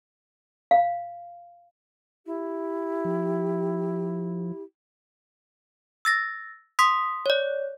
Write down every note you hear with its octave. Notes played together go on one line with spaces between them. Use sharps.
F5
E4 G4
F3
E6 A6 A#6
C6 D#6 B6
C#5 D5